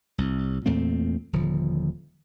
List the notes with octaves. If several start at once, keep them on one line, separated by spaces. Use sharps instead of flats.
C2
E2 A#2 A3 C4
D#1 D3 F3